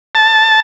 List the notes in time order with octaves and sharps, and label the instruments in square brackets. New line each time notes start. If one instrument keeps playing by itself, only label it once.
[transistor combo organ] A5